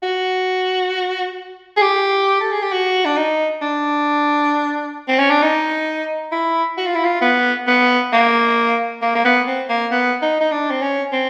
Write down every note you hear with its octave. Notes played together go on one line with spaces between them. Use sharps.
F#4
G#4
G4
A4
G#4
G4
F#4
D4
D#4
D4
C4
C#4
D4
D#4
E4
F#4
F4
E4
F4
B3
B3
A#3
A#3
A#3
B3
C4
A#3
B3
D#4
D#4
D4
C4
C#4
C4